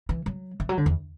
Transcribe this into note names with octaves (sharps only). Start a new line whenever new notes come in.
E3
F#3
E3
F#3
D3
E2